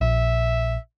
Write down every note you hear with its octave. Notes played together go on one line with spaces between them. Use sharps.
A#1 E5